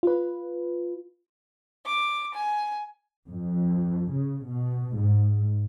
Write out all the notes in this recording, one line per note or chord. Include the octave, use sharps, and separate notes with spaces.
F4 B4
D6
G#5
F2
C#3
B2
G#2